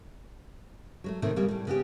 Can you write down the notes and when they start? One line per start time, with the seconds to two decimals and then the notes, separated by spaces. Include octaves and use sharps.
1.04 F#3 G#3 A3
1.22 A2 C3 D#3 A3
1.36 C#3 G3 A#3
1.48 A2 G3
1.67 C#3 B3 C#4 G4